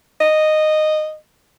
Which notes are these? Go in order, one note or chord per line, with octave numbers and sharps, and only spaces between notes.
D#5